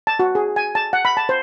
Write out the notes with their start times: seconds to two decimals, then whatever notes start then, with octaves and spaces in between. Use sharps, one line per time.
0.07 A5
0.19 F#4
0.35 G#4
0.56 G#5
0.75 A5
0.93 F#5
1.05 B5
1.17 A5
1.29 C5